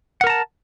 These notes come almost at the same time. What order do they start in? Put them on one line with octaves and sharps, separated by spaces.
F#5 A#4 A#5 A5